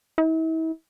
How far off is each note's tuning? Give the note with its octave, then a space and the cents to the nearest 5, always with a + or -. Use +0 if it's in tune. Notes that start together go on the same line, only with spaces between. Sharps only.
E4 -40